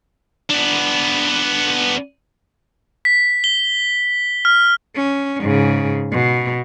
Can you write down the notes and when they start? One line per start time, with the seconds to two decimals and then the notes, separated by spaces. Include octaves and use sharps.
0.50 B3 D4
3.05 B6
3.44 G7
4.45 F6
4.95 C#4
5.41 G#2 C#3
6.12 B2